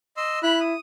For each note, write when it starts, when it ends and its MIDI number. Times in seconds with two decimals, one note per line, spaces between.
0.17 0.39 75
0.17 0.39 84
0.17 0.39 88
0.43 0.75 64
0.43 0.60 83
0.43 0.60 90
0.61 0.80 87